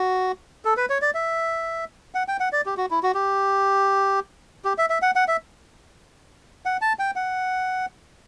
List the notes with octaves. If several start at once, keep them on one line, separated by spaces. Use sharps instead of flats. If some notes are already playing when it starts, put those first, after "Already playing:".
Already playing: F#4
A4
B4
C#5
D5
E5
F#5
G5
F#5
D5
G4
F#4
E4
F#4
G4
G4
E5
E5
F#5
F#5
E5
F#5
A5
G5
F#5